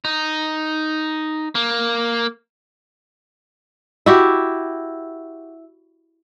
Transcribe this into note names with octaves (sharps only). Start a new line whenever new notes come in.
D#4
A#3
E4 F#4 G4